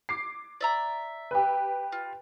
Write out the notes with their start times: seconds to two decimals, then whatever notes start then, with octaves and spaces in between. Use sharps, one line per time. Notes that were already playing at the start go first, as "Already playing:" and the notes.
0.09 D6 C7
0.61 D5 E5 A#5
1.31 G4 B4
1.92 F4